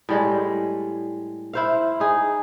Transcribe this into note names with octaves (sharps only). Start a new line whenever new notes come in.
A2 G3 G#3
E4 C5 F5
D#4 G#4